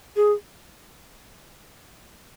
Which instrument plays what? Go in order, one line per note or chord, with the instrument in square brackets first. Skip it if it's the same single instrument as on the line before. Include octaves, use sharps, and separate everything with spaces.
[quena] G#4